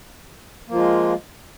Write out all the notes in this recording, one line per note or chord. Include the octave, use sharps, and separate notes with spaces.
F3 G#3 A#3 F4